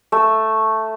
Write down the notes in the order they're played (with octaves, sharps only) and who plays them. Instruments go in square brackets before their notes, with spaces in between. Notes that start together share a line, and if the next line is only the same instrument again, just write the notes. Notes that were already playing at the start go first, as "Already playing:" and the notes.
[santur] A3 E6